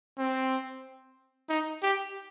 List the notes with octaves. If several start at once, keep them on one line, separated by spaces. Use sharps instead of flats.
C4
D#4
G4